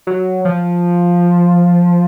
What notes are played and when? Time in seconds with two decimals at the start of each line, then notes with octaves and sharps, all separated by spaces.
0.07 F#3
0.45 F3